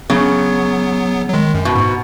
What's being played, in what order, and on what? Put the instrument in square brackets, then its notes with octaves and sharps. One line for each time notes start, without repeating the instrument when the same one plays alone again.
[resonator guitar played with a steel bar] C#3 [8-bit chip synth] F#3 B3
[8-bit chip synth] F#3
D#3 G#3
F#2
[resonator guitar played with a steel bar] B2
[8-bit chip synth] G#2